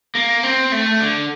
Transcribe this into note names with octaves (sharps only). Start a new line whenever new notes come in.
A#3
C4
A3
D3